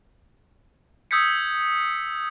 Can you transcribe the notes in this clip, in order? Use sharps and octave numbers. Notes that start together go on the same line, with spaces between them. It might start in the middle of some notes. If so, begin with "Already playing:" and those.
D#6 E6 G6 G#6 B6 C#7